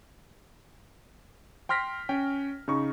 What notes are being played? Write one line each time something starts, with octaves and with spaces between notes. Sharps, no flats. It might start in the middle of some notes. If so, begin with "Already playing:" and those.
G5 C6 F6 A#6 B6
C#4 G5
C#3 D#4 C#6